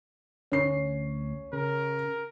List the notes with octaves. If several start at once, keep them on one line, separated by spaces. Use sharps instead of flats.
D2 C#4 C7
C#3 A#4